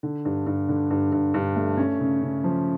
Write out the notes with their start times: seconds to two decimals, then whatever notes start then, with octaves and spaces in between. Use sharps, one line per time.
0.03 D3
0.25 G2
0.47 G2
0.69 D3
0.90 G2
1.12 G2
1.34 G2
1.56 A3
1.77 C#4
2.00 C#3
2.22 C#3
2.44 F3